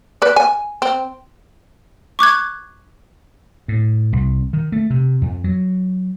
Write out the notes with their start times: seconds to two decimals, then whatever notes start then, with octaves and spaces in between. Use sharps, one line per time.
0.22 B4 D5
0.36 G#5
0.82 C4
2.19 C#6 D6 F#6 G#6
3.68 A2
4.13 C2
4.53 D#3
4.72 A3
4.90 C3
5.22 F2
5.44 F#3